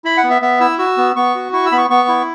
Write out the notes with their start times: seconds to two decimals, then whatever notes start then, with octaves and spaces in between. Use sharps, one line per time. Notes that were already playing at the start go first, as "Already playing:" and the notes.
0.05 E4 B5
0.17 F#5
0.24 B3
0.30 E5
0.42 B3 E5
0.60 E4 E6
0.79 F#4 E6
0.97 B3
1.16 B3 C#6
1.35 F#4
1.53 E4 C#6
1.66 E6
1.72 B3 B5
1.78 C#6
1.90 B3 C#6
2.08 E4